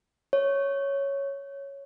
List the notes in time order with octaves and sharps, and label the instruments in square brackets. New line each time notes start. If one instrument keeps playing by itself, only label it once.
[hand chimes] C#5